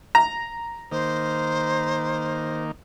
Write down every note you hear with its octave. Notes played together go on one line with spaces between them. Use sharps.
A#5
D#3 A#3 C5